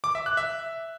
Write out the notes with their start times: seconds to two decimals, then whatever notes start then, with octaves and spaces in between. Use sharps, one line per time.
0.04 D6
0.15 E5
0.26 F#6
0.37 E5